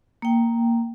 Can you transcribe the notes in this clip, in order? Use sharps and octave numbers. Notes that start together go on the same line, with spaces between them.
A#3 G5